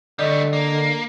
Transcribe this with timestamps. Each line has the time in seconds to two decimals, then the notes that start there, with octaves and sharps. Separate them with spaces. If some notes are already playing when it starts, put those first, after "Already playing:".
0.19 D3 G3 A3 D5 D#5
0.53 A#3